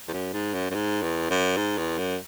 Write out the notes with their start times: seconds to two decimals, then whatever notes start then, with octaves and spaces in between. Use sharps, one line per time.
0.08 E2
0.13 F#2
0.33 G#2
0.54 F#2
0.70 F#2
0.75 G#2
1.02 E2
1.30 F#2
1.57 G#2
1.78 E2
1.98 F#2